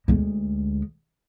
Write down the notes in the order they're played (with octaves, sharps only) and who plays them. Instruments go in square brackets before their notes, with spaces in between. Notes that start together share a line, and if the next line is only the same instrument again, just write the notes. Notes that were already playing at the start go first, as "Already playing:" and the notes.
[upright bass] D2 G#3